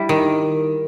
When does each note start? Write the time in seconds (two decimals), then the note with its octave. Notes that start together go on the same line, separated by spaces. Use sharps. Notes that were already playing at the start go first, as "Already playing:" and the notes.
Already playing: G3 E4
0.09 D#3